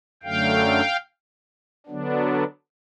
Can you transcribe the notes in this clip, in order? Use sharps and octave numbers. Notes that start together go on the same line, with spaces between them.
F#2 D3 F#3 A3 F5 G5
D3 F#3 B3 D4